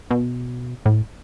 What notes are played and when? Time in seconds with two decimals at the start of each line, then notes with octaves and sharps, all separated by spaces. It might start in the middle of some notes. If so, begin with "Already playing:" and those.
0.11 B2
0.86 A2